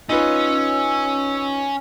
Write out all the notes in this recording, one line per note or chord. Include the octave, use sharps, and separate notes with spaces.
C#4 D#4 F4 B4 C#5 E6